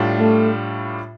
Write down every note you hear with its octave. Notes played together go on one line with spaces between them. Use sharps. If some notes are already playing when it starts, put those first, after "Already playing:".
Already playing: A2 G3 D4 F4
A3